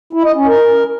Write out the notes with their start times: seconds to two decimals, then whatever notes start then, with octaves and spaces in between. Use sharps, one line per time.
0.13 E4
0.24 D#5
0.36 C#4
0.47 A#4